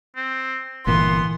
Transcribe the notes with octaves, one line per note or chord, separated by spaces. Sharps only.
C4
G1 A#2 E3 A#3 B3 A4 C6 D#6